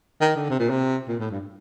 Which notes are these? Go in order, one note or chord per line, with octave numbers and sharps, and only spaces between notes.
D#3
D3
C3
A#2
C3
A#2
A2
G2